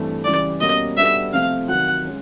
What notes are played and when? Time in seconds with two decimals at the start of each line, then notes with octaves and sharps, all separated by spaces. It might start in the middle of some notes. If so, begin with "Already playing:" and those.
Already playing: G2 E3 A3 C4
0.24 C#3 E3 G3 D5
0.61 B2 G3 A#3 C#4 D#5
0.97 G3 B3 D4 F#4 A4 E5
1.33 C3 F3 A3 C4 F4 F5
1.68 C3 D#3 F#3 F#5
2.05 G#3 C#4